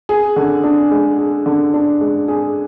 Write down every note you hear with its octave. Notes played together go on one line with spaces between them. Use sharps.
G#4
D3
D4
G#3
G#4
D3
D4
G#3
G#4